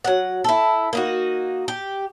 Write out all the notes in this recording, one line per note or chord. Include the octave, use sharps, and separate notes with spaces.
F#3 F#5
E4 A4
A#3 D#4 F#4
G4